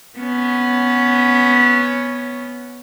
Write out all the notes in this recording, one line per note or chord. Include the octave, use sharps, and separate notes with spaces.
B3 C#4